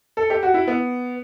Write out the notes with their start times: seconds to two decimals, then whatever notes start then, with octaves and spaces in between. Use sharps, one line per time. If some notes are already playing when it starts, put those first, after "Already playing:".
0.17 A4
0.30 G4
0.43 F#4
0.54 E4
0.68 B3